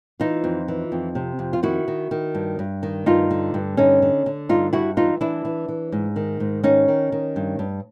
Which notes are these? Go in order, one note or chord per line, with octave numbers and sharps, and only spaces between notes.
E3 D#4 F4
F2
E3
F2
C3
F2
F4
D#3 E4 F#4
D#3
D#3
G2
G2
D#3
G2 D#4 F4
D3
G2
D3 C#4 D#4
D3
D3
G2 D#4 F4
G2 E4 F#4
E3 D#4 F4
E3 D4 E4
E3
E3
G#2
D#3
G#2
D#3 C#4 D#4
D#3
D#3
G2
G2